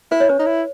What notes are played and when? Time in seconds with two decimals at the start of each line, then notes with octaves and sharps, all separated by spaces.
0.11 E4 B4
0.20 C#5
0.29 C#4 B4
0.39 D#4
0.47 E4